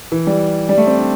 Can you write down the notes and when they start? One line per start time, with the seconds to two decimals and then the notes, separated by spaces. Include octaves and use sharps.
0.12 E3
0.27 G3
0.69 G3
0.78 A3
0.87 C4
0.96 D4